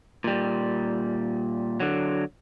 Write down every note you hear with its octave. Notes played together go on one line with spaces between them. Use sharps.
A#2 G3
D3 F#3